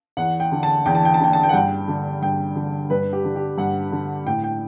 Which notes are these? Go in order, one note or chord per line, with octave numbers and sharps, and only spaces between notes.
E2 F#5
G5
D3
A5
E2 G5
A5
G5
A5
D3 G5
A5
G5
F#5
G2 G5
D3
G2 G5
D3
G2 B4
G4
D3
G4
G2 F#5
D3
A2 G5
G5